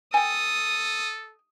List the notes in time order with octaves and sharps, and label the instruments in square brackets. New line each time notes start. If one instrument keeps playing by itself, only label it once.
[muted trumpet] A4 [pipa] G5 G#5 [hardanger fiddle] D#6